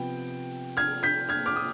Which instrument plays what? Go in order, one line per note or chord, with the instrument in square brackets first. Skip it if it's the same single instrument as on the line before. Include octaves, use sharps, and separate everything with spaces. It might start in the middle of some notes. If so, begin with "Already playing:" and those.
Already playing: [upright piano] C3 F3 B3 G5
F6 G#6
G6 B6
F6 G#6
D6 F6
D#6